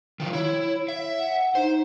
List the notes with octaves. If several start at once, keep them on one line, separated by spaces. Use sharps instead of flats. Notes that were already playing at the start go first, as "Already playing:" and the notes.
D#3 F3
E4 C#5
E5
F#5
D#4 C5